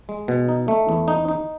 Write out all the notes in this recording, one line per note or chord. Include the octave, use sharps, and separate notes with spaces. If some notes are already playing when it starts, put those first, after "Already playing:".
G#3
B2
D#4
A3
E2
D#4
D#4